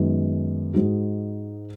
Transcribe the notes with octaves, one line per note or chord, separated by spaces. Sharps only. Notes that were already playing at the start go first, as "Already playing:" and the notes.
Already playing: F#2 D#3 G#3 B3 D#4
G#2 G#3 D#4 F#4